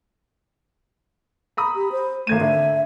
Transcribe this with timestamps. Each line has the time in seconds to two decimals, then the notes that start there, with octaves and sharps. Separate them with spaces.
1.57 A#5 B5 D#6
1.76 G4
1.92 C5
2.27 G#1 A3 G#6 D#7
2.41 D3 E5